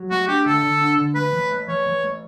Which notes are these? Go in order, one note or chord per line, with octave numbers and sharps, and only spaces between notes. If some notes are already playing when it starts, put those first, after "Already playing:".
Already playing: F#3
A3 F#4
D4 G4
D3 A4
D3
D4
D3
A3 B4
E3
A3
E3 C#5
E3
A3